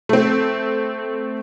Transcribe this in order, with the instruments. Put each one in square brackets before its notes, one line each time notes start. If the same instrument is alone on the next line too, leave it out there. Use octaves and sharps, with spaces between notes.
[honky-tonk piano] A3 C4